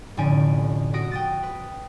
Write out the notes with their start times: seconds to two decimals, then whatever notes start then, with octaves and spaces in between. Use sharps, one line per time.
0.17 F1 A2 D3 C#4 G#5 D7
0.94 F#4 D#6 A#6 D7
1.11 G5 D#6 A6
1.43 B4